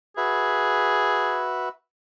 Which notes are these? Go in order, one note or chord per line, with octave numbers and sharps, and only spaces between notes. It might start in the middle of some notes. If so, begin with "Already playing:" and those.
F#4 G#4 B4 E5